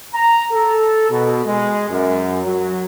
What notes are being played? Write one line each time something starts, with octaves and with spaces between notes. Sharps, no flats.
A#5
A4
B2
G#3
F#2
F#3